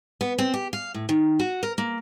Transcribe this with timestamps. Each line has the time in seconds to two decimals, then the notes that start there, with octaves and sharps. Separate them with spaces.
0.21 B3
0.38 C4
0.54 G4
0.73 F5
0.94 A2
1.09 D#3
1.39 F#4
1.63 A#4
1.78 A#3